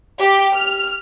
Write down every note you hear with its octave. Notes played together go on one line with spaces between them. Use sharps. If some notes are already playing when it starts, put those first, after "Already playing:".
G4
F6